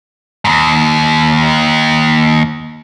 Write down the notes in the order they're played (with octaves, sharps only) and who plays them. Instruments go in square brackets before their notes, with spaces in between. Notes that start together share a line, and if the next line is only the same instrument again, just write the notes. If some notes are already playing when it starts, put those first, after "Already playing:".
[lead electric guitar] D#2 G#2